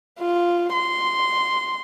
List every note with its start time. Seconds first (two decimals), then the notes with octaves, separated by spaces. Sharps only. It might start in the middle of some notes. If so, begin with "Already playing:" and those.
0.19 F4
0.73 C6